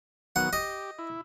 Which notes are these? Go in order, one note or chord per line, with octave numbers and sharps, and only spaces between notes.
D#3 F#3 B3 F#5
G4 D#5
E4